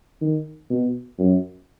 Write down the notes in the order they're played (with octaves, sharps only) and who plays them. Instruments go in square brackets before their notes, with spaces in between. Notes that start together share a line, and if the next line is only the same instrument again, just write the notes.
[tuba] D#3
B2
F#2